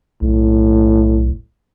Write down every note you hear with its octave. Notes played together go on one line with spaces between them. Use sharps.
B1 A2